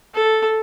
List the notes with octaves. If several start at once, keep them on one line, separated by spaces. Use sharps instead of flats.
A4